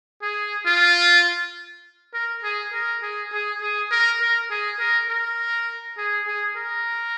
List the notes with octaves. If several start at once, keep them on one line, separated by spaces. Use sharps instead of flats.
G#4
F4
A#4
G#4
A#4
G#4
G#4
G#4
A#4
A#4
G#4
A#4
A#4
G#4
G#4
A#4